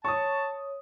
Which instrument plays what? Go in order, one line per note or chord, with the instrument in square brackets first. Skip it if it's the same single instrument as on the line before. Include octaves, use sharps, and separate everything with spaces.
[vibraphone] C#5 [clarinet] A5 [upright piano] C#6 D#6